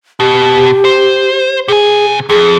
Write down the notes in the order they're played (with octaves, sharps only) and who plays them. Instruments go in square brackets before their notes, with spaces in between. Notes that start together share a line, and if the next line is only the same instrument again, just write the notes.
[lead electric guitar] B2 [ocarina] G4
[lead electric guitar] C5
[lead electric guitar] C3 G#5 [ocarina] G#4
[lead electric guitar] F2 [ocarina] G#4